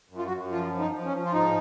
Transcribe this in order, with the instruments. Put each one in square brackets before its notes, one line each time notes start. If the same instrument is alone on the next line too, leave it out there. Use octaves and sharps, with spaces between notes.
[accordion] F#2
F4
F#4
F#2
F3 F4
F3
D#4
F3
C#4
F3
F4
G#2 D#4